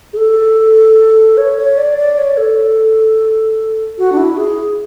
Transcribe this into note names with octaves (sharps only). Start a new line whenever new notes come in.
G#4
A4
C#5
C#5
D5
D5
C#5
A4
F#4
D4
E4
G#4